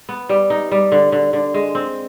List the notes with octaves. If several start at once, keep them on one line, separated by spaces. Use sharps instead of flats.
B3
G3
D#4
G3
D3
D3
D3
G#3
C4